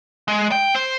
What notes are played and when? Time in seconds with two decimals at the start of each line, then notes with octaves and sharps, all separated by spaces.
0.28 G#3
0.52 G5
0.74 C5